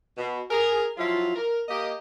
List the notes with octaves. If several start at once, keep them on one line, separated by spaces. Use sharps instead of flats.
B2
G#4 A#4
F3 F#3 E4 F4
A#4
A#3 G4 D#5